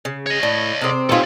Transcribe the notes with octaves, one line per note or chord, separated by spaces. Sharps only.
C#3
C#5 D#5
A2 D5
C3 C4 G#4 A4 C5
D#4 F4 G4 A4 B4 C#5 G#5